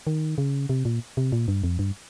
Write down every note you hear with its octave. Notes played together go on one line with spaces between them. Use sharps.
D#3
C#3
C3
A#2
C3
A#2
G2
F2
G2